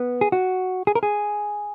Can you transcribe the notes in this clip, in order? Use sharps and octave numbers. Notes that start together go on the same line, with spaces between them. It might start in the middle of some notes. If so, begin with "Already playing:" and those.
Already playing: B3
G#4
F#4
G#4
A#4
G#4